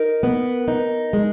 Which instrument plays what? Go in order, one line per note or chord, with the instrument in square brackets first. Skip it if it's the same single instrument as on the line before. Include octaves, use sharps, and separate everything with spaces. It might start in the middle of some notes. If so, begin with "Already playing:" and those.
Already playing: [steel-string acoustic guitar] D#4 [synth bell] A#4
[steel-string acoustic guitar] B3
D#4
G#3